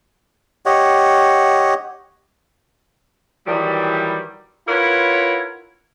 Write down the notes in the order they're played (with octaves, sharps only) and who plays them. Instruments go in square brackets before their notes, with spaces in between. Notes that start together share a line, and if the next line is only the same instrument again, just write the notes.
[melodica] G4 C#5 D#5 F#5
[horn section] D#3 E3 F#3 G3
E4 F4 A#4 B4 C#5 F#5